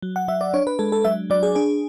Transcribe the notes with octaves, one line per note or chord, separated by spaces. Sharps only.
F#3
F#5
F#3 E5
D5
D4 C#5
B4
G#3 A4
A4
F#3 E5
F#3 D5
G#4
D4 G#4